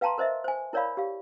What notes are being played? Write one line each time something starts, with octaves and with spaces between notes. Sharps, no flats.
B4 F5 G5 A5 A#5 C6
A#4 C5 D#5 E5
C5 G#5
E4 A#4 C#5 D5 F5 B5
G4 F5